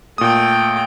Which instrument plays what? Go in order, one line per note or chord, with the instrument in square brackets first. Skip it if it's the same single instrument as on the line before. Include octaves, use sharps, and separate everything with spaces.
[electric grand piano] A#2 D#6 [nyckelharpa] A3 G5